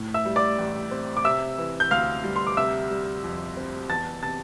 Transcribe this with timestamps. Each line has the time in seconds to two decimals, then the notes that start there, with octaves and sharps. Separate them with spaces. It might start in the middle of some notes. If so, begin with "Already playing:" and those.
Already playing: A2
0.14 E5 E6
0.25 G3
0.36 D5 D6
0.58 A1
0.91 C4
1.17 D6
1.25 C3 E5 E6
1.58 E3
1.80 G6
1.91 D2 F5 F6
2.24 G3
2.36 C6
2.47 D6
2.57 C3 E5 E6
2.91 G3
3.24 F2
3.57 C4
3.89 E2 A5 A6
4.23 C3 A5 A6